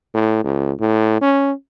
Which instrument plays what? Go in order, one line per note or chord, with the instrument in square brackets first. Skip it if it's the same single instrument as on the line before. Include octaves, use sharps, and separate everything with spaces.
[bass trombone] A2
C#2
A2
C#4